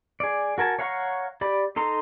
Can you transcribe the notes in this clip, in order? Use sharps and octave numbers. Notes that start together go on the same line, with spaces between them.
G#4 D5
F#4 A#4 G#5 A5
C#5 F5 F#5 A#5 C#6
G4 D5 B5
D#4 A4 A#5 C6